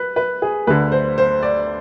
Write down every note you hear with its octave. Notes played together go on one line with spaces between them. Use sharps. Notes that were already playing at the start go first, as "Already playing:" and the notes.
Already playing: B4
B4
G#4
D2 D3 B4
C5
C5
D5